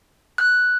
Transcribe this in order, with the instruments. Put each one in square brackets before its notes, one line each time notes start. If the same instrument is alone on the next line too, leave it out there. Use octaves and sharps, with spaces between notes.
[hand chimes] F#6